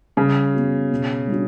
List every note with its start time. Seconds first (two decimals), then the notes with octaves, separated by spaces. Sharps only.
0.17 C#3 G3
0.53 B3 F#4
0.91 B2
1.27 G3 D4 F#4